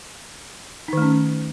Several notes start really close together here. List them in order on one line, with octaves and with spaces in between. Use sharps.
D#4 D#3 A3 C#4